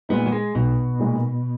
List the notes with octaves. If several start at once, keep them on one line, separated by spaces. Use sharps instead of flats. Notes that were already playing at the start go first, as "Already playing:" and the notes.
A#2 G#3 B3 D#4
F#3
G#3
B1 B2
A#2 G#3 D#4